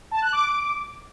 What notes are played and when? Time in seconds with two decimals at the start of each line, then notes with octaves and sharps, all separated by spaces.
0.11 A5
0.22 F#6
0.33 D6